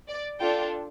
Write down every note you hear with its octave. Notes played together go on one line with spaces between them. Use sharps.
D5
D4 F4 A4 G5